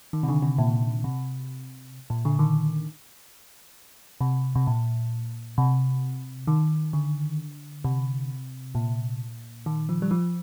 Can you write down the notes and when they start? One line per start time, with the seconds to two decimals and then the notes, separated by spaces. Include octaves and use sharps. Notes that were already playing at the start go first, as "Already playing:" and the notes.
0.13 D#3
0.23 C3
0.29 D3
0.42 C3
0.58 A#2
1.04 C3
2.10 A#2
2.25 D3
2.39 D#3
4.21 C3
4.56 C3
4.67 A#2
5.58 C3
6.47 D#3
6.93 D3
7.84 C3
8.75 A#2
9.66 D#3
9.89 F3
10.02 G3
10.11 F3